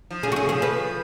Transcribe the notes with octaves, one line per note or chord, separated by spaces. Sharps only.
F3
C#3 G#4
F#4
C#3 G#4
F3 G#4
B4